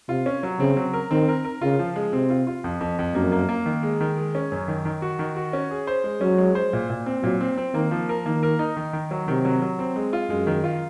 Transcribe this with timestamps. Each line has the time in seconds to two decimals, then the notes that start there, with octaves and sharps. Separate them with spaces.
0.09 C3 F4
0.26 C#4
0.43 F#3
0.59 C#3 C4
0.76 F#3
0.93 A#4
1.11 D#3 C4
1.28 A#4
1.44 A#4
1.62 C#3 F4
1.79 F3
1.96 G#3
2.13 C3 C4
2.30 F4
2.47 F4
2.64 F2
2.81 F2
2.99 F2
3.15 F#2 A#3
3.32 A#3
3.49 A#3
3.66 D#3
3.83 G#3
4.01 D#3
4.18 G#3
4.35 C#4
4.52 F#2
4.68 D#3
4.85 D#3
5.02 F#4
5.19 D#3
5.36 F#4
5.53 C#4
5.71 G#4
5.87 C5
6.04 G#3
6.21 F#3 C#4
6.38 G#3
6.55 C5
6.73 A#2
6.90 A#2
7.06 C4
7.23 A#2 F#3
7.41 C4
7.57 C4
7.74 D#3 A#3
7.91 F3
8.09 A#4
8.26 D#3 A#3
8.43 A#4
8.59 D#4
8.77 D#3
8.93 D#3
9.11 F#3
9.28 C3 D#3
9.45 F#3
9.62 F#3
9.79 C4
9.96 G#3
10.13 F4
10.30 F#2 G#3
10.47 D#3
10.64 F4